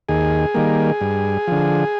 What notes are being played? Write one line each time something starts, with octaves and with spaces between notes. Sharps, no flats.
D#2 G#4
D#3 G3 A#3
G2
D3 F3